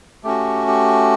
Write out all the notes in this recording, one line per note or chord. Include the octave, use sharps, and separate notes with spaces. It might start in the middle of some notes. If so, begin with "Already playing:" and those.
A3 C#4 F#4 G4
G4